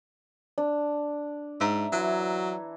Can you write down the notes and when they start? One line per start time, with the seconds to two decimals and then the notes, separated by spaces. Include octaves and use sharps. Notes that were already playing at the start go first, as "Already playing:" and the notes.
0.58 D4
1.60 G#2 E5 A#5
1.92 E3 F#3